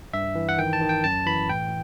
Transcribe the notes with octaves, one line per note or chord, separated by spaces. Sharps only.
G2 E5
E3
F#5
D#3 G5
A5
D#3
G5
F#2 A5
E3 B5
A2 G5